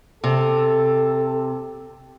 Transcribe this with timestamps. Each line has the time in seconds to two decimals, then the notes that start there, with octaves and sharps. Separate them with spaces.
0.24 C3 A4